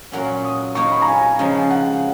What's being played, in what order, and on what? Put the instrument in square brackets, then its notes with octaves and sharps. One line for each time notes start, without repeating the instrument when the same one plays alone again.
[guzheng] A#2 F#3 C#4 F#4 A#4
[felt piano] D#6
[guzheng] A#3 D#4 A#4 C#5 [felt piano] C#6
[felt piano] B5
A#5
G#5
[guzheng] C#3 F3 G#3
[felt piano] F#5